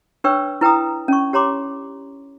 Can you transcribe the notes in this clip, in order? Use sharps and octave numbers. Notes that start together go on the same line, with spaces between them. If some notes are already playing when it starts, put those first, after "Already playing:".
D4 B4 C#5 G5 C#6 E6
E4 B4 G5 A#5 D#6
C#4 D5 C#6
G4 C#5 A#5 C6 D6